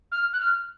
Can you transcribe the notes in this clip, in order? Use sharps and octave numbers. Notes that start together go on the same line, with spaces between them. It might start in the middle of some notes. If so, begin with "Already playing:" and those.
F6
F#6
F6